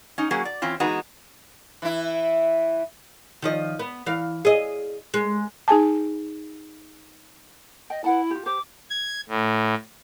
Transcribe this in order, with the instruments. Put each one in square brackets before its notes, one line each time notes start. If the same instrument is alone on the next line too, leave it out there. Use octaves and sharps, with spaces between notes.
[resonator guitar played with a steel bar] C#4 D#4
F#3 A#3 C#4 F#4 G#4
D5
E3 C4 C#4 F4
E3 G#3 B3 D#4 F#4
[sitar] E3 E4
[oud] D#3 F3 D#5
B3
E3 F5
G#4 D#5
G#3
[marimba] D#4 G#4 G#5 A5
[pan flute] D#5 [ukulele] G5
[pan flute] E4 [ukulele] B4 F#5 A5
[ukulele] F4 G4
[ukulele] G4 C5 [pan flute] D6
[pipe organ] G#6
A2